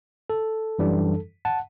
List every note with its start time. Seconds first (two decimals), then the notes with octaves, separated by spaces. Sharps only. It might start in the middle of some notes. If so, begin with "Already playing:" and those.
0.30 A4
0.79 F#2 E3 G3 D4
1.45 F#5 A5